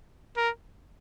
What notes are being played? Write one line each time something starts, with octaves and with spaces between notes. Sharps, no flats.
A#4